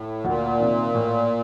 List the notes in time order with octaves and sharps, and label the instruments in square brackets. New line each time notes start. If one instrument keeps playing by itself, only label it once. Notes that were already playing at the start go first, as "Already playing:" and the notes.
Already playing: [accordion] A2
[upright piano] D2 [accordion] A#2
[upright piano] C3 D#3
A2